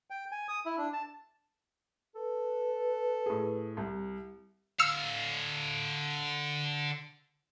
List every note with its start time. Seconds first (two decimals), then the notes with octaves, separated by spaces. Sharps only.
0.10 G5
0.32 G#5
0.48 D#6
0.66 E4
0.78 D4
0.93 A5
2.15 A4 B4
3.26 A2 G#4
3.77 C2
4.79 D3 F5 E6 F6 C#7